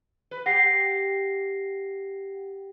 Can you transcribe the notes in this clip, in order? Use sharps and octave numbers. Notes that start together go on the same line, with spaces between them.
B4
G4 F#5 A#6 C7